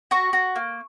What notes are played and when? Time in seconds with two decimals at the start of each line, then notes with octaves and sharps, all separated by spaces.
0.11 F#4 C#6
0.33 F#4
0.56 A#3